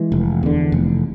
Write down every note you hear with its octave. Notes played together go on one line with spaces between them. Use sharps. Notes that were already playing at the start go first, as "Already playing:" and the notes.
Already playing: E3 G#3
F1
E2 D3
F1